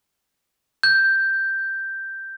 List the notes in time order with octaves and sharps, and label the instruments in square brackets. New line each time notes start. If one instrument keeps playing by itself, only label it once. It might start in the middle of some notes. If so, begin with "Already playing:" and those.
[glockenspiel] G6